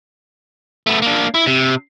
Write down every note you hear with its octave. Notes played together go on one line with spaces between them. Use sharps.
A3 B3
A#3 D4
E4
C3